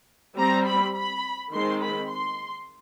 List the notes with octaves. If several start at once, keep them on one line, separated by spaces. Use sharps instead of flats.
G3 C4 A#5
B5
B5
D#3 G#3 C4 C6
B5
C6